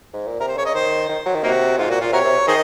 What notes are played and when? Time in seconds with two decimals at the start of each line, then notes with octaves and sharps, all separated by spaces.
0.13 G#2
0.27 A#2
0.40 C3 A#4
0.48 C5
0.57 C#3 C#5
0.65 D#5
0.74 D#3 C5
1.09 D#3
1.26 F#3
1.35 D#3
1.43 C3 A#3 D#4 F#4
1.78 G#2 F4
1.90 A#2 F#4
2.01 A#2 F4
2.13 C3 F#4 A#4 C#5
2.25 C3
2.47 D#3 G#4 C5 D#5